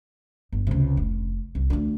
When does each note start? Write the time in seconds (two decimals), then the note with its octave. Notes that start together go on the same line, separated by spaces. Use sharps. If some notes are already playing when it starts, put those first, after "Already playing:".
0.52 G1
0.67 C#2 C3
0.97 F1
1.55 C2
1.70 D2 D4